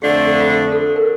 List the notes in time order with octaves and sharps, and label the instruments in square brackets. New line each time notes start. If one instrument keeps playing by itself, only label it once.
[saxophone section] F2 D3 F3 A3 D4 [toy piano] G4
[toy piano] A4
F4
G4
A4
A#4